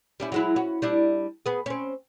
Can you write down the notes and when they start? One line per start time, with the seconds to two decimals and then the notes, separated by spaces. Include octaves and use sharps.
0.20 G3 C#4 E4
0.32 F#3 G#3 E4
0.56 C#4 F#4
0.82 G3 D4 E4
1.46 B3 G#4
1.66 C4 C#4